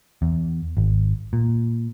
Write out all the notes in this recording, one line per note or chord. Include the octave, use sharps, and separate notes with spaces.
E2
G#1
A#2